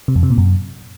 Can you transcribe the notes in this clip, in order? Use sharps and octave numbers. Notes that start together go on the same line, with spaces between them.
C3
F2
C3
A#2
F#2